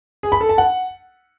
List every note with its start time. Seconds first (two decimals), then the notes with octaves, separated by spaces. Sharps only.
0.23 G#4
0.32 B5
0.41 A4
0.49 A5
0.58 F#5